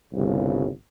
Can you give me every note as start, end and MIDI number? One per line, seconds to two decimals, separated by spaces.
0.13 0.67 31
0.13 0.67 36
0.13 0.67 49